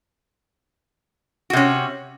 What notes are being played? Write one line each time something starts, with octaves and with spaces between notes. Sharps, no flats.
C3 C#4 F#4